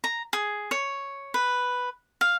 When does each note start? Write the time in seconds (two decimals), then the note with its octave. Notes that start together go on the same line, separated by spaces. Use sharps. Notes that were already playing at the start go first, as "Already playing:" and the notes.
0.04 A#5
0.33 G#4
0.71 C#5
1.34 B4
2.21 F5